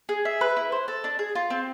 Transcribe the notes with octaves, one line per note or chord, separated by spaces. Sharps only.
G#4
E5
B4
E4
C5
A4
D4
G#4
F4
C4